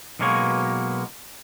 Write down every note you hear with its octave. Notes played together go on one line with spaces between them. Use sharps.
B1 B2 G#3 A#3 C#5